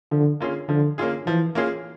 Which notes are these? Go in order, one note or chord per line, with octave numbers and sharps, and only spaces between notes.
D3 F3
A#3 C#4 F4 G#4
D3 F3
A#3 C#4 F4 G#4
E3 F3
A#3 C#4 F4 G#4